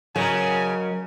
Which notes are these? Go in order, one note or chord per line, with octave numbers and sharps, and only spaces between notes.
C#3 F#3 A#4 D#5 G#5 A#5